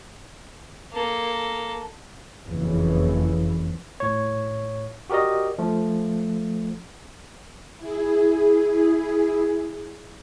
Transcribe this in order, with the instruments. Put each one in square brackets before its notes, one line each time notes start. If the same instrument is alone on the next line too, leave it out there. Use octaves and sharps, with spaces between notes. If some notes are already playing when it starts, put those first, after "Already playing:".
[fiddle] A#3 A4
[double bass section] F#1 F2 C#3 E3
[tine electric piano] A2 C#5
F#4 G4 A#4 D5 D#5
F3 A3
[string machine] E4 G#4